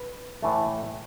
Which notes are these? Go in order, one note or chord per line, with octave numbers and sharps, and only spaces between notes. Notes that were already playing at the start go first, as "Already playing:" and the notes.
Already playing: B4
A2 E3 A3